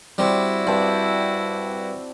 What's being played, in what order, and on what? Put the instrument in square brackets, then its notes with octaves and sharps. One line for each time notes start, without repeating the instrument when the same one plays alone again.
[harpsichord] G3 C4 [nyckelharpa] E4 F#4 [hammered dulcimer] D5
[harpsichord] G2 [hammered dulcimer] C4 A5